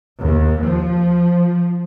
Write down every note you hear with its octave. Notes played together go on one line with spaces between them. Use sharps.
D#2
F3